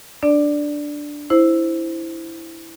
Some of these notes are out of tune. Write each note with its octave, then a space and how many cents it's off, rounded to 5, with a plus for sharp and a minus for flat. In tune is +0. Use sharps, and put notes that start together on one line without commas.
D4 +0 D5 +0
E4 +0 C5 +0